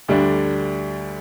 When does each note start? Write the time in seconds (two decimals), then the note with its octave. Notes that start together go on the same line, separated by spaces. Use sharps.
0.08 D2 D3 G3 D4